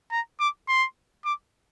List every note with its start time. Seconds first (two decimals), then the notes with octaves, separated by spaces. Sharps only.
0.12 A#5
0.40 D6
0.68 C6
1.25 D6